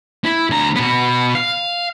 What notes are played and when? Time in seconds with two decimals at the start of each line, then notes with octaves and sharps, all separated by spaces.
0.24 E4
0.50 D2 A#5
0.76 B2 B3
1.35 F5